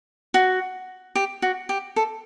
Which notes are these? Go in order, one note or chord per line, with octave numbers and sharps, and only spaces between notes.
F#4
G4
F#4
G4
A4